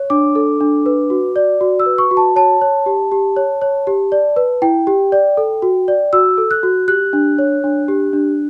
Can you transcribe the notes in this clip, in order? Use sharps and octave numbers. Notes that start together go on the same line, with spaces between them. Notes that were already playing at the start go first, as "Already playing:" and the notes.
Already playing: C#5
D4 D6
A4
D4
B4
F#4
D5
F#4
E6
B4
C#6
F#4
A5
C#5 A5
C#5
G4
G4
C#5
C#5
G4
D5
B4
E4 G5
G4
D5
A4
F#4
D5
F#4 E6
A4
F#6
F#4
G4 F#6
D4
C#5
D4
G4
D4